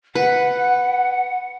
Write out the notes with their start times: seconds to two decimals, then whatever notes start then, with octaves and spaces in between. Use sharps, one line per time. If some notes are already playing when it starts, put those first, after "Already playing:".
0.15 B4 F#5